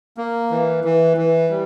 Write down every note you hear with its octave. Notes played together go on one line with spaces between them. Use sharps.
A#3
E3
E3
E3
G3